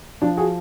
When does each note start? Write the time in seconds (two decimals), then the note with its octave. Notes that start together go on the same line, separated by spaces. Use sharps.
0.22 F3 D4
0.37 F#4 G#4